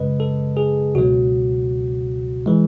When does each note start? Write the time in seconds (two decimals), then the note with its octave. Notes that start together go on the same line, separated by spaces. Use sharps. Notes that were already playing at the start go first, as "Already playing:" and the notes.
Already playing: F#2 C#3 G#3 B4 D#5
0.20 A4
0.57 G#4
0.95 C#2 B2 F#3 F#4
2.46 E3 G#3